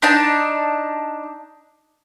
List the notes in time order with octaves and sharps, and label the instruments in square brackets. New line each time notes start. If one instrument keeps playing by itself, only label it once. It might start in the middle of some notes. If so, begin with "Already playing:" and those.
[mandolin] D4 D#4 A5